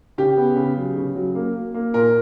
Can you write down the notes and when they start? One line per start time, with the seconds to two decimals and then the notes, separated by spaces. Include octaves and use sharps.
0.18 C#3 G4
0.37 B3
0.56 C#3
0.77 F#3
0.96 C#3
1.16 F#3
1.35 A#3
1.55 A#3
1.74 A#3
1.94 A#2 A#4